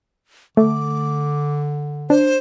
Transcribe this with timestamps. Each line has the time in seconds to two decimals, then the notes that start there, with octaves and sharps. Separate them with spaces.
0.57 D3 A3 D6
2.10 D4 C5